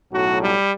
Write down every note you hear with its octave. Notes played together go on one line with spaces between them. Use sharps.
B1 A2 F#3 F#4
G3